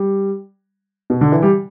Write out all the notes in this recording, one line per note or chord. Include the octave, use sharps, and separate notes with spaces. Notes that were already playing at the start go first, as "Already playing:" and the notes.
Already playing: G3
B2
D3
E3
G3